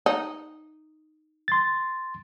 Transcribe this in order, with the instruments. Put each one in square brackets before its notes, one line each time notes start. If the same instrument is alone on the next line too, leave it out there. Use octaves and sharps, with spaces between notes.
[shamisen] D#4
[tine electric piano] C6 A6